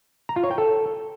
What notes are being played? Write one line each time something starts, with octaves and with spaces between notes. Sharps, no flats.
A#5
F4
C#5
G5
A4